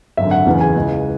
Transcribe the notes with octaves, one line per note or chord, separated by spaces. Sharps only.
G#1 F#2 D3 E5
F#5
F#1 E2 C#3 E3
G#5
C#2 C#3 E3